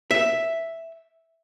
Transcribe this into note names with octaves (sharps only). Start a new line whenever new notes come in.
E5